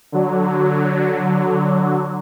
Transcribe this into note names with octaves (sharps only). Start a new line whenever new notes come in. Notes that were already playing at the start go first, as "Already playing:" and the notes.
D3 F#3